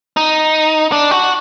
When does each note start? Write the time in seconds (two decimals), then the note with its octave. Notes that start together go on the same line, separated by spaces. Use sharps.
0.17 D#4
0.92 D4
1.11 F#4